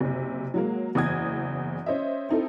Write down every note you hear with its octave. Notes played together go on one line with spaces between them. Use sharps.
F#1 C3
F#3 G#3 A#3
F#1 E2 D#6 G#6
C#4 C5 D#5 E5
C4 D#4 E4 A4